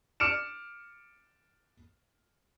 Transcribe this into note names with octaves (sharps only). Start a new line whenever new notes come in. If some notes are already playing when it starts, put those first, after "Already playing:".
D6 F6 C#7 D7 E7